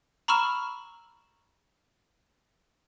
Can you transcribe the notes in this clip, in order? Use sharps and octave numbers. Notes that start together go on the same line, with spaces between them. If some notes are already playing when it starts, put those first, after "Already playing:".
A#5 B5 C#6 E6 F6 E7